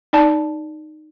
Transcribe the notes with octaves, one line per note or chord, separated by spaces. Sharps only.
D#4 D5 A5